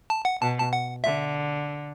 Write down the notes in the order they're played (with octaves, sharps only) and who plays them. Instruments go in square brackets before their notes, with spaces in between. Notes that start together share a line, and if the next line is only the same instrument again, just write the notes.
[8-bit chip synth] A5
F#5
[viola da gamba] B2 [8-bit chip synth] A5
[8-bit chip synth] A5
F#5
[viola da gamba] D3 [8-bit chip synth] E5